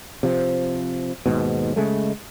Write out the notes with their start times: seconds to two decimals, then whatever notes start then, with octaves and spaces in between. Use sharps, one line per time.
0.23 C3 F3
1.26 D#2 G#2 B2
1.76 C#3 G#3 A3